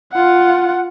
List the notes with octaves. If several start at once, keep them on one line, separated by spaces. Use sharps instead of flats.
F4 F#5